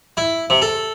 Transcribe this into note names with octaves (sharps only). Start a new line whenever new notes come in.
E4
C3
A4